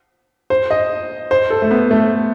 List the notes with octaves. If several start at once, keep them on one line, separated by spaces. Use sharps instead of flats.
C5
D#5
C5
A4
A3
B3
A3